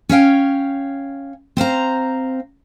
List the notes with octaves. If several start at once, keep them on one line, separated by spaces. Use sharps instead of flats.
C#4 C#5 F5 G5
C4 C5 F5 A#5